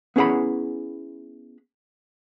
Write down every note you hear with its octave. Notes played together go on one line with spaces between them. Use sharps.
B3 C#4 E4 G#4 F#5 B5